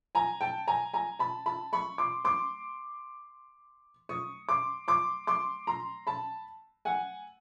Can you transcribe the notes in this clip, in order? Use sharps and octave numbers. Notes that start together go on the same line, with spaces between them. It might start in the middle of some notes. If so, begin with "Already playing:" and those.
G#5 A#5
G5 A5
G#5 A#5
G#5 A#5
A5 B5
A5 B5
B5 C#6
C6 D6
C6 D6
C#6 D#6
C6 D6
C6 D6
C6 D6
A#5 C6
A5 B5
F#5 G#5